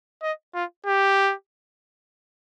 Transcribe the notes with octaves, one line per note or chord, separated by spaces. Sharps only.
D#5
F4
G4